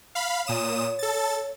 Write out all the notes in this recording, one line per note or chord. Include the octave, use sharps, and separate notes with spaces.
F5 B5
A#2 C#5 D#6 E7
A4 A6